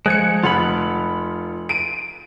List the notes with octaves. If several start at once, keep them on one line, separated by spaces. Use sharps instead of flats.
F3 G#3 F#6 G#6 C#7
F1 F4 F#5 B5
D7 D#7